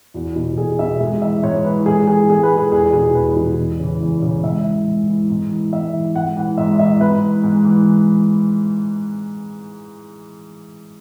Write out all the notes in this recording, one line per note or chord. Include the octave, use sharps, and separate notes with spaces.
E2 F#4
B2
E2 G#4
B2 E5
G#2 G#4
E3 E5
G#2 C#5
E3 B4
G#2 G#4
E3 G#4
G#2 G#4
B4
E3
G#4
E2 G#4
B2 G#4
E2 B4
B2
E2
C#3 E3
E2
C#3 E3
G#2 E5
E3
G#2
E3
G#2
E3
G#2 E5
E3
G#2 F#5
E3 F#5
G#2 E5
E3 E5
G#2 B4
E3
G#2
E3